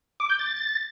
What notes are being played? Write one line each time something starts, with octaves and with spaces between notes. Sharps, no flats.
D6
G6
A6